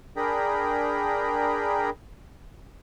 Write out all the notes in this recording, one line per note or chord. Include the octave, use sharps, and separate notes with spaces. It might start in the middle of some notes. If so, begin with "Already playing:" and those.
D4 G#4 A#4 G5 A#5 B5